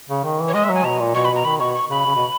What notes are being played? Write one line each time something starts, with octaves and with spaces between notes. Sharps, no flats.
C#3
D#3
E3
C#5
G#3 D#5
G#3 E5
F#3
G#5
B2 A#5
A#2
B2 C#6
B5
B2
A#5
D#3 B5
B2 C#6
C#6
C#3 B5
C#3
B2